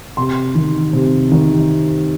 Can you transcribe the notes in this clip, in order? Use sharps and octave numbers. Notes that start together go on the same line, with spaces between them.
C3 C6
D#3
C3
D#3